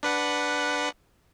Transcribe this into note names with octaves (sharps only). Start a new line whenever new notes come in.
D4 B4 F#5